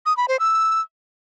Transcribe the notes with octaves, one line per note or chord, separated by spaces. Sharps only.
D#6
B5
C5
E6